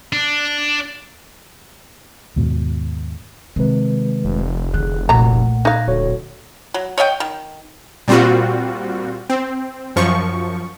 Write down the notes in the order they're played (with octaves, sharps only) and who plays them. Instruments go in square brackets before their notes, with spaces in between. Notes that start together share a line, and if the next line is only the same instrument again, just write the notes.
[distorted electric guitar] D4
[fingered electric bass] D#2 G#2 B2
[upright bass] C3 [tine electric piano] D#3 G#3 B4
[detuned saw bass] F1
[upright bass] D3 [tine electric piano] G#4 F#6
[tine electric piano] B1 A3 F#5 [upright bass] A#2 [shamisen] F#3 A#5
[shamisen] D#4 F5 [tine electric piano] F#6 G#6 A#6
[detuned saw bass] D1 [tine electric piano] F#4 A4 C#5
[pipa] F#3
C#5 D#5 E5 G5
D#3
[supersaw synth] A#2 G3 C4 F4 F#4
C4
F#2 F3 C#6